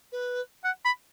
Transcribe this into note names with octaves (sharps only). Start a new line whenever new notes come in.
B4
F#5
B5